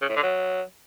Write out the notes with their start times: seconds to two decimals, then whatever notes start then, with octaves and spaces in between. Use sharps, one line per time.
0.02 C#3
0.09 A2
0.16 D3
0.23 F#3